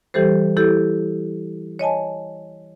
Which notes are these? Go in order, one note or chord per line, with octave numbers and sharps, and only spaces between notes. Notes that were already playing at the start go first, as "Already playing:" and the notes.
E3 G3 G4 A4 C5
E4 G4 A4
C#5 D#5 G#5 A5